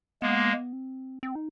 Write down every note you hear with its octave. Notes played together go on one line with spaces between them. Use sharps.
G#3 A#3 B3
C4
C4
D#4